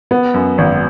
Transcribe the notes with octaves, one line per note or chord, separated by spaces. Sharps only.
B3
F#2
G#1